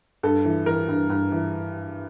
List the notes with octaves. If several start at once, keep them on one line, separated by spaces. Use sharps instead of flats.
G2 A4
E3
E3 A#4
G2
G2
E3